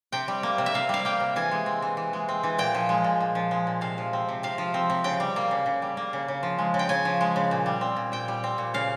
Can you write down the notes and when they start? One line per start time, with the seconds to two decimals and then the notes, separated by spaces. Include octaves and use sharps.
0.12 C3 G5
0.28 G3
0.43 A#3
0.58 C3
0.66 E5
0.74 C3 F5
0.89 G3 F5
1.05 A#3 G5
1.20 C3
1.36 E3 G#5
1.51 G#3
1.66 C4
1.82 E3
1.97 E3
2.13 G#3
2.29 C4
2.43 E3
2.58 A#2 G5
2.75 F3
2.89 G#3
3.04 A#2
3.20 A#2
3.35 F3
3.51 G#3
3.67 A#2
3.81 C3 F5
3.98 F3
4.13 C4
4.29 C3
4.43 C3 F5
4.58 F3
4.74 C4
4.90 C3
5.04 C#3 G5
5.20 G3
5.36 A#3
5.51 C#3
5.66 C#3
5.82 G3
5.97 A#3
6.13 C#3
6.28 C#3
6.43 F3
6.58 G#3
6.74 C#3
6.79 G5
6.89 C#3 G#5
7.05 F3
7.21 G#3
7.36 C#3
7.51 A#2
7.66 G3
7.81 C4
7.96 A#2
8.12 A#2 G5
8.28 G3
8.44 C4
8.58 A#2
8.74 C#3 F5